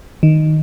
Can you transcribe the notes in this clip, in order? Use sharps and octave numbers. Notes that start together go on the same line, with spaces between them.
D#3